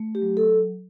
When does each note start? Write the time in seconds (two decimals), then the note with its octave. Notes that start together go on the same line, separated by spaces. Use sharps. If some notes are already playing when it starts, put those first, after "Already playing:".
Already playing: A3
0.15 G4
0.22 F#3
0.37 A4